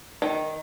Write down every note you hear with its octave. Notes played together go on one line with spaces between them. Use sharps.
D#3